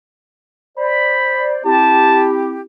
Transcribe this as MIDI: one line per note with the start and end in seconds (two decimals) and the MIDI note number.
0.77 1.61 72
0.77 1.61 74
0.77 1.57 83
1.64 2.61 60
1.64 2.61 64
1.64 2.61 67
1.64 2.28 81